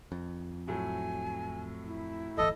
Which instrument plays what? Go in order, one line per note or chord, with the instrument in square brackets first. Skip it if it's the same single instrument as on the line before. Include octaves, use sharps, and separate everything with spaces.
[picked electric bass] F2
[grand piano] A2 F#3 A3 [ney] G#5
[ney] E4
[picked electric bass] D1 G1 E3 [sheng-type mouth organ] A4 D#5